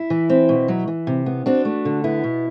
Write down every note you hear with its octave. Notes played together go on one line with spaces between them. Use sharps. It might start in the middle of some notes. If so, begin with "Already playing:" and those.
Already playing: E4
E3
C4
B2
F#3
E3
C3
B3
C4 D4 F#4
A3
D3
B3 E4
B2